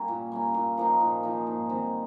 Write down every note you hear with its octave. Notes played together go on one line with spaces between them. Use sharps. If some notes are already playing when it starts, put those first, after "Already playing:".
Already playing: G3 A#3 C#4 G4
A#2
G3 A#3 C#4
A#2
F3 A#3 D#4
A#2
F3 A#3 D#4
G#2
D#3 G3 C4